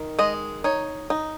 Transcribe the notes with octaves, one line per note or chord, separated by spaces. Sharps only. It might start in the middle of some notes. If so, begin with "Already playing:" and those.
Already playing: D#3
G#3 D#5
D#4 C#5
D#4